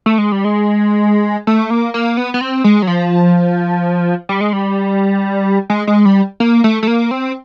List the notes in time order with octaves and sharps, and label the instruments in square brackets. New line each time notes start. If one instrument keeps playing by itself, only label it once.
[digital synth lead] A3
G#3
G3
G#3
A3
A#3
A#3
B3
B3
C4
G#3
F#3
F3
G3
G#3
G3
G#3
G#3
G3
A#3
A3
A3
A#3
C4